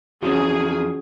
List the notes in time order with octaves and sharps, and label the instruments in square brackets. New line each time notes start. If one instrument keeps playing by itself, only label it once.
[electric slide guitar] E2 F3 [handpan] C#4 F#4 [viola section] G#4